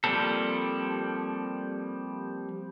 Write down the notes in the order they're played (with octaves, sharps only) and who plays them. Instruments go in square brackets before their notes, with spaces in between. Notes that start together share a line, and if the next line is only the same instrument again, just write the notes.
[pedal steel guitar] F3 G3 A#3 C4 A4